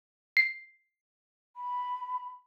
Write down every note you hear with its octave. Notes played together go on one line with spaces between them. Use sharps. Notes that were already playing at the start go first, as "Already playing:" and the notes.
C7
B5